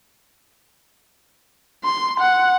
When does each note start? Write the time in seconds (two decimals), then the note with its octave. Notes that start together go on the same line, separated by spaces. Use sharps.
1.84 C6
2.20 F#5